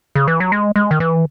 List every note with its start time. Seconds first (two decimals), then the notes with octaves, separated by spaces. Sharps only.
0.15 C#3
0.28 E3
0.40 F#3
0.52 G#3
0.76 G#3
0.91 D#3
1.00 E3